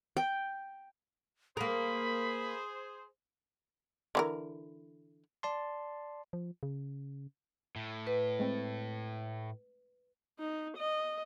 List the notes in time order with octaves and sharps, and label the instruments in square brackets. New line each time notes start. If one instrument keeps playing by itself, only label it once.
[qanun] G5
[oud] A#3 A#4 [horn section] G#4 C5 [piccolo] B5
[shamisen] D3 E3 A#4
[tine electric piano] D5 A5 C6
[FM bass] F3
C#3
[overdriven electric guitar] A2
[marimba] B4
[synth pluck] G#3 A3 C4
[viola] D#4
D#5